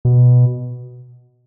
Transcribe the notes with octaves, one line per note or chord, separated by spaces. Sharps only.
B2